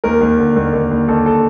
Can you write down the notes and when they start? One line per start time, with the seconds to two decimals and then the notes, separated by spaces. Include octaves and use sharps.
0.04 D#2 A#4
0.21 D#2
0.38 D3
0.56 D#2
0.73 D#2
0.91 D#2
1.08 D#2 A4
1.26 A4